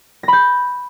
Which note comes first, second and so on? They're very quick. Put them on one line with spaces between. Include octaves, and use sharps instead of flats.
A#6 B5 G6